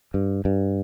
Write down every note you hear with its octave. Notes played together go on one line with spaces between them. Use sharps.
G2
G2